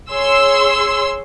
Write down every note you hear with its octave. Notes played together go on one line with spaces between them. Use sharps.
G#4 C#5 C6 E6